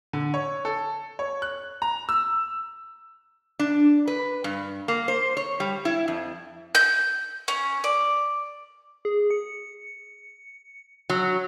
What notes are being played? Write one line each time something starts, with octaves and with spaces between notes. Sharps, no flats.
D3
C#5
A4
C#5
F#6
A#5
E6
D4
B4
G2
A#3
C5
C#5
G3
E4
F2
G6
C#4
D5
G#4
C#7
F#3